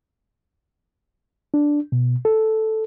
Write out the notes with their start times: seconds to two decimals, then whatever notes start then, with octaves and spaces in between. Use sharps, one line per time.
1.54 D4
1.92 B2
2.25 A4